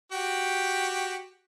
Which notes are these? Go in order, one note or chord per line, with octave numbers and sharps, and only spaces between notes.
F#4 G4